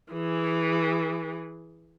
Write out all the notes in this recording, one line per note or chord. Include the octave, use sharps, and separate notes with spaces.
E3 G#4